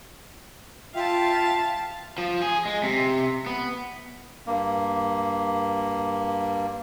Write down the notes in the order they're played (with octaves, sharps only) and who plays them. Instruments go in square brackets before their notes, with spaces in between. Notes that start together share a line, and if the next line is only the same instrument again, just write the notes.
[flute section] F4 E5 G5 [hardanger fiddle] F5 A5
[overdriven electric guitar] F3
G#4
G#3
C3
B3
[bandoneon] G2 A#3